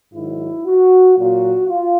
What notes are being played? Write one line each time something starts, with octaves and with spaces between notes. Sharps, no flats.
G#2 D#3 F#3 E4
F#4
A#2 F#3 F#4
F4